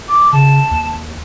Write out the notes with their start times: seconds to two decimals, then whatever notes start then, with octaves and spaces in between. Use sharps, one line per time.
0.09 D6
0.33 C#3 A5
0.71 D#2